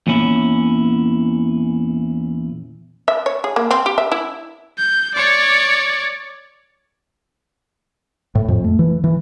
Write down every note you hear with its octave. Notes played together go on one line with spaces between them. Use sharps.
E2 A#2 C#4 E4
E5
C#5
G#4
A#3
C4
G4
E5
E4
G6
C#5 D5
A2
F2
A3
E3
E3